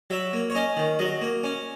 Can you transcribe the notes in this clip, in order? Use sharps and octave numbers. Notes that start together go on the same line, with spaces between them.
F#3 E5
A#3
C#5
C#4 D#5
D#3
F#3 D#5
A#3
C#4